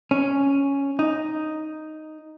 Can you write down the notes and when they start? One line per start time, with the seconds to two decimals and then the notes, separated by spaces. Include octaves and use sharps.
0.11 C#4
0.99 D#4